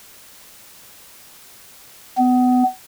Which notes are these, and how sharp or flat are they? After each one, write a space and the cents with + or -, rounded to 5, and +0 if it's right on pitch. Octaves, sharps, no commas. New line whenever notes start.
B3 +25